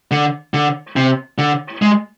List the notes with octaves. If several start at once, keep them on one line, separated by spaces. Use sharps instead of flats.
D3
D3
C3
D3
G#3